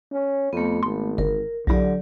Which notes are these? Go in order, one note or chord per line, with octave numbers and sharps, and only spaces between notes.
C#4
F2 A3 B3
G#1 C6
G1 A#4
B1 D3 F#3 E4 G4 D5